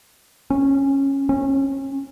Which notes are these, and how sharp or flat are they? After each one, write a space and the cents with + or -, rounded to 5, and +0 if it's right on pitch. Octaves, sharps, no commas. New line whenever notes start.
C#4 -15
C#4 -25